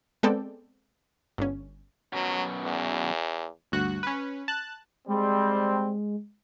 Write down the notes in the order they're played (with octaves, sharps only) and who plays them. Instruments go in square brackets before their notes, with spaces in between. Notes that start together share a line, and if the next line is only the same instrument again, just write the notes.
[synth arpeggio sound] G#3 B3 C4 A4 D5 G5
G1 C#4
[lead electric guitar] F#2 B2 [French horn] F#3
[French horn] E2
[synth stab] D2 G2 F#4 F#6
C#4 B4
A5 F#6
[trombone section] G3 C4 [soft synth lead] G#3